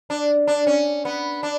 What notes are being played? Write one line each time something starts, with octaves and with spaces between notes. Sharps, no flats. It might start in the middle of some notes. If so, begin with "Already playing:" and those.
D4
D4
C#4
B3
D4